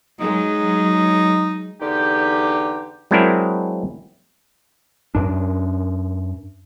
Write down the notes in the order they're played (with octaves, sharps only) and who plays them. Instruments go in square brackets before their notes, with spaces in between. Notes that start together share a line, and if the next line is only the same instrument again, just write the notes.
[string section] F#3 G#3 [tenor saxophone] D#4
[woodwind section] E2 D3 D4 D#4 G4
[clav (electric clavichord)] F#3 G#3 C4 D4 E4 A#4
[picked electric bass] F#2 D4